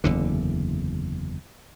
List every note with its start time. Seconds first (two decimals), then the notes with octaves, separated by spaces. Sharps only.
0.04 F#1 E2 D3